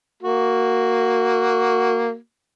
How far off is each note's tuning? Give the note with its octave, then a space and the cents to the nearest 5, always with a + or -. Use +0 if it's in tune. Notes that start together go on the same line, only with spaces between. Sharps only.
A#3 -10 F#4 +0